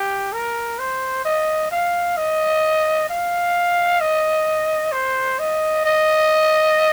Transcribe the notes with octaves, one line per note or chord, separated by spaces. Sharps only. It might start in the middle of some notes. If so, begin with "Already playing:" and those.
Already playing: G4
A#4
C5
D#5
F5
D#5
F5
D#5
C5
D#5
D#5